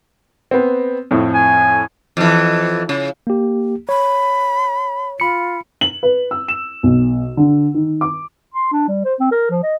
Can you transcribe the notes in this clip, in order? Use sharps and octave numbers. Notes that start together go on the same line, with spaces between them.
B3 C4
F2 A2
G#5
F2 E3
C#3
A#3 G4
C#5 B5
F4 B5 C#7
F#7
B4
E6
E7
B1
D3
D#3
D6
C6
D4
G3
C5
C4
A#4
F3
D#5